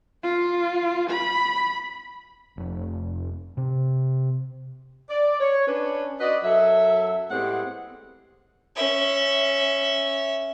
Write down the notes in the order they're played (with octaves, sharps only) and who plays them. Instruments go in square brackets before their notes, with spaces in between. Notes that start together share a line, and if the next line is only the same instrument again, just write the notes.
[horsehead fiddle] F4
B5
[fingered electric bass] F1
C3
[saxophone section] D5
C#5
C#4 D4 B4
F#4 B4 D5 D#5
F#2 F#3 A4 E5
A2 G#3 B3 C4 G4 F#5
[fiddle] C#4 E5